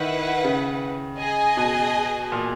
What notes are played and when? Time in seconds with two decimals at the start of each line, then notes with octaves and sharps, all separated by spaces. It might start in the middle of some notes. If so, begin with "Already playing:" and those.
Already playing: D#3 E4 B4 F#5
0.44 C#3
1.19 G#4 D#5 G#5
1.57 B2
2.32 A#2